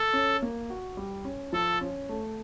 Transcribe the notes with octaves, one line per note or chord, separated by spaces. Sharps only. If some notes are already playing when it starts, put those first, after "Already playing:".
Already playing: A4
C#4
A#3
F#4
G3
C#4
F3 A4
C#4
A3